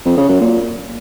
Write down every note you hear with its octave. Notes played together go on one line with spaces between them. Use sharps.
F2
C#3
F#2
A#2